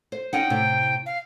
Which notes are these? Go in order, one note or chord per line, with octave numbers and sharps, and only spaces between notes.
C5
C#4 D#4 F#5 G5
A2 C3
F5